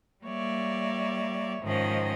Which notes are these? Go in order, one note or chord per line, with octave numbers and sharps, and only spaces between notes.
G3 A#3 C#5 D5 E5
G#2 D#3 F3 C#4 D#5